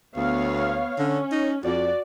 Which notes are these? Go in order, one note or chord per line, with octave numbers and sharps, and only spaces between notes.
D2 B3 C#5 F5
D3 C#4
D#4
F2 F#4 D5